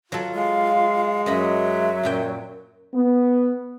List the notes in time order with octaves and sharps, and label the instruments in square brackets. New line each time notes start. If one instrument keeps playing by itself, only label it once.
[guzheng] F#3 A4 [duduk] F4
[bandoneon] G#3 [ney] F5
[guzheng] F#2 D#5 B5 [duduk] F#3 [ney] E5
[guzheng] F#2 A#2 G5
[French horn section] B3